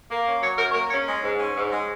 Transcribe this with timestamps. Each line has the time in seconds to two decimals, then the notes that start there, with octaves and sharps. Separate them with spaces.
0.09 A#3
0.26 C#4
0.42 F#3 C#5
0.57 F#2 A#4
0.69 C#5
0.74 A#3 A#4
0.90 C#4 C#5
1.06 G#3
1.23 G#2
1.39 C#4
1.56 G#2
1.71 G#3